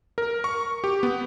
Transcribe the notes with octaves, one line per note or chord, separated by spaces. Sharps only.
A#4
C#6
G4
B3